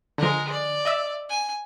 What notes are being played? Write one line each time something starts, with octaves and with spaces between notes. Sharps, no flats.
D3 F3 G#3 A#4
D5
D#5 E5 E6
G#5